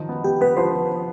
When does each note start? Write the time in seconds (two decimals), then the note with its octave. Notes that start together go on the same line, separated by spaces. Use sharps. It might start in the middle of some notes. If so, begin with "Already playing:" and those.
Already playing: D#3 F3 D#4
0.09 B3
0.24 B3 G4
0.41 B3 B4
0.57 F3 C5